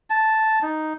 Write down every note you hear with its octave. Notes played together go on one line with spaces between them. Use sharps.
A5
D#4